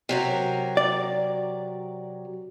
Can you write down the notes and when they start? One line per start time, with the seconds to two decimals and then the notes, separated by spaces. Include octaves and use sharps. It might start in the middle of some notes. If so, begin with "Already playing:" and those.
0.09 C3 F#3 A#4
0.77 D5